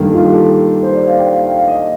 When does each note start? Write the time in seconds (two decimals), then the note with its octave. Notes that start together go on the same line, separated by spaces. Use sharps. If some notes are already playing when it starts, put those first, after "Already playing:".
Already playing: G2 D#3 A#3 A4
0.13 F4
0.24 G4
0.33 A4
0.83 C5
0.95 D5
1.07 F5
1.19 G5
1.31 F5
1.44 F5
1.56 F5
1.68 D#5